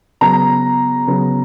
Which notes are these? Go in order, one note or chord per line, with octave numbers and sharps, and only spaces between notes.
C#3 F#3 B3 A#5
C#3 F#3 B3